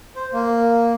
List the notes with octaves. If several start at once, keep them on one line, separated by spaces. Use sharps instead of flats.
C5
A#3